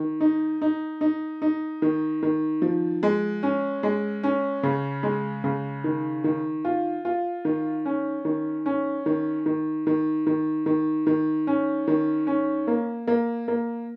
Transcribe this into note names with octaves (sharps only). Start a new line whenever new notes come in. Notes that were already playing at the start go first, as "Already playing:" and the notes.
Already playing: D#3
D#4
D#4
D#4
D#4
D#3
D#3
F3
G#3
C#4
G#3
C#4
C#3
G#3
C#3
D#3
D#3
F4
F4
D#3
C#4
D#3
C#4
D#3
D#3
D#3
D#3
D#3
D#3
C#4
D#3
C#4
A#3
A#3
A#3